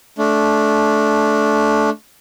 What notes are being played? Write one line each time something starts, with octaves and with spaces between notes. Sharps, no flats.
A3 D4